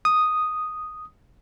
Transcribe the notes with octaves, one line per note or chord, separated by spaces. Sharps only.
D#6